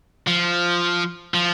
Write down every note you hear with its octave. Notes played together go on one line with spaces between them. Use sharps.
F3
F3